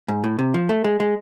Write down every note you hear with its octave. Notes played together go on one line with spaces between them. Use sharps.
G#2
A2
C3
F3
A3
G#3
G#3